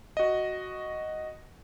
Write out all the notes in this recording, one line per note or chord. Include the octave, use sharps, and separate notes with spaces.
F#4 D#5